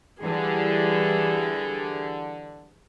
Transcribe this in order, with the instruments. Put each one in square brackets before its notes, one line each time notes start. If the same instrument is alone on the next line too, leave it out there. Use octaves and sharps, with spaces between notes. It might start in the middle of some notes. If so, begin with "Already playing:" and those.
[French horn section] D3 [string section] E3 G3 [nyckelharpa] G#4